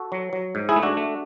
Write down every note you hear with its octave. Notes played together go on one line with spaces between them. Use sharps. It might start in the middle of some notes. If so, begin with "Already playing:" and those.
Already playing: F#4 A4
F#3
F#3
G#2
E4 G#4
A3
D4 F#4
A3